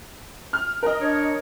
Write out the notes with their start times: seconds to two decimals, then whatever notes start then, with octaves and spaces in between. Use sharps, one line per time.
0.53 F6
0.83 A#4 D#5
0.99 D4 C#5